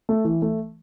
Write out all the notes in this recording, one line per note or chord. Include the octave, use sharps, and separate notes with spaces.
A3
E3
A3